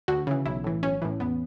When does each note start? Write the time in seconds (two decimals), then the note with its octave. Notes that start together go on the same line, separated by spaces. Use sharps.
0.08 D2 F#4
0.27 C#3 E3
0.46 B1 E4
0.64 A2 E3
0.83 B1 C#4
1.02 A2 E3
1.20 E2 B3